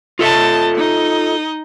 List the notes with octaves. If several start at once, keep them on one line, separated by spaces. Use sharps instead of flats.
F4 A4 D#5 E5 A5
D#4 D#5